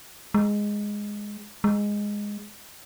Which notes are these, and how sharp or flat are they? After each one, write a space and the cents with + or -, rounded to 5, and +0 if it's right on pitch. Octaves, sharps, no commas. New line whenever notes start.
G#3 -5
G#3 -10